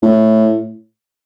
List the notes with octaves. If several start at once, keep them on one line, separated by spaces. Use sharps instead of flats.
A2